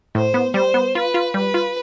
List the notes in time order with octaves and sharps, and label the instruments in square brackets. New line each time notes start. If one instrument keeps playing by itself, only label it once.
[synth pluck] A2 [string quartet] C5
[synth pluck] B3
[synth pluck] G3 [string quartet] C5
[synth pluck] B3
[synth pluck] F4 [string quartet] B4
[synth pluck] F4
[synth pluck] G3 [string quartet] B4
[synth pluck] F4